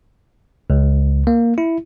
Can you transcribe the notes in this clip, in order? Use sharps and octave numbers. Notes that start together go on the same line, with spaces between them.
C#2
A#3
E4